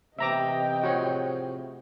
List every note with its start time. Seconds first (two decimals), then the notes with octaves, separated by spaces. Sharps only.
0.19 A1 C3 B3 D#5 E5 G5 A#5 D6
0.83 A2 F3 F#4 G#4 C#5